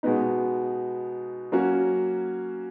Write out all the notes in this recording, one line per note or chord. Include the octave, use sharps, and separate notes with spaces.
B2 G#3 B3 D#4
F#3 A#3 C#4 F#4